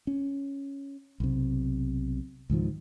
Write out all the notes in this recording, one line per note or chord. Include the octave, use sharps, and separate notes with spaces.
C#4
B1 C3
C#2 G#2 D#3 F3